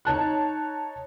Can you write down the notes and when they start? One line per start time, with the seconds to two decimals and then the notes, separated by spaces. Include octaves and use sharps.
0.05 D#4 C#5 A5 F#6